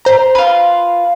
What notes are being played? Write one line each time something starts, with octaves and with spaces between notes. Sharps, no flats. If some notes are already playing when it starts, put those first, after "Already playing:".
C5 A#5
F4 B4